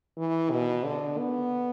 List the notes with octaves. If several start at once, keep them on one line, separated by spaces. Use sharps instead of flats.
E3
B2
D3
B3